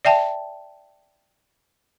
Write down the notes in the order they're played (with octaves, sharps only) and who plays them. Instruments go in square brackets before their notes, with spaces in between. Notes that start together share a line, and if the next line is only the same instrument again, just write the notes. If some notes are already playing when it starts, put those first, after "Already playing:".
[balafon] D5 E5 G5 A5